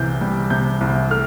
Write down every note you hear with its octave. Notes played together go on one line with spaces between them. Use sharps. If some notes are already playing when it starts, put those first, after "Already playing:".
Already playing: C2 C3 E3 G6
G3
C3 G6
C2
A3 F6